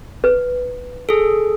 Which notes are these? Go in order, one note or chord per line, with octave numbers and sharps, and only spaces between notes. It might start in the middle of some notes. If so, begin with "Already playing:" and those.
B4
G#4 A4